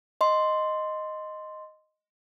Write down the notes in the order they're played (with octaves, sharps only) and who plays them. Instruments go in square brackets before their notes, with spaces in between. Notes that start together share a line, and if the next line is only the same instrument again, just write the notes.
[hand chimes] D#5 C6